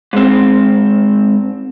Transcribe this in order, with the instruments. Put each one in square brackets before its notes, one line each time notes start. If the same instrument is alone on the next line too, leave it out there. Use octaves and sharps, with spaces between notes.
[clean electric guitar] G#2 C4